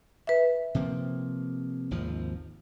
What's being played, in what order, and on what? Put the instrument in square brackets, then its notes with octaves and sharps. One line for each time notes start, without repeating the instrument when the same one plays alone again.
[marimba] B4 E5
[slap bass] C3 F3 A#3
G#1 D#2 F3